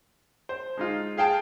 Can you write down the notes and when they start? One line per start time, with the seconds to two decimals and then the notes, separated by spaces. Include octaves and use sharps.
0.49 C5
0.77 G#3 D#4 F4
1.17 G#4 F5 G5 A5